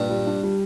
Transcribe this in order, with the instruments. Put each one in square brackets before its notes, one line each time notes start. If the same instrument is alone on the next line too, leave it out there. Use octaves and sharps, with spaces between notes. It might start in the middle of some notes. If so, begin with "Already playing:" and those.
Already playing: [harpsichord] G2 [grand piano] A#2
[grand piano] G3
D4
G3